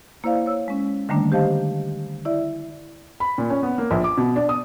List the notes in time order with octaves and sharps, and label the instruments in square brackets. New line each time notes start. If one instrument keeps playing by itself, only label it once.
[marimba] A#3 E4 C5 D5 F5
C#5 E6
G#3 C#4
D3 D#3 G3 A3 A#3 D4
G4 C5 D#5 F5 A5
E4 D5 E5
[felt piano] B5
A#2
C#4
B3
A#3
A#1
D6
B2
D4
D#6